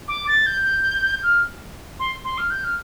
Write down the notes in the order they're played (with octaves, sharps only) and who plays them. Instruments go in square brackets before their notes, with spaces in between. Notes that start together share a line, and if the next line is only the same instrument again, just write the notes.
[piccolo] D6
A6
G6
F6
C6
C6
F6
G6
F6